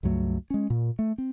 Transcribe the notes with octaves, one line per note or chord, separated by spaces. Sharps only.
C#2 G2 F#3 A3
G#3 C#4
A#2
A3
C4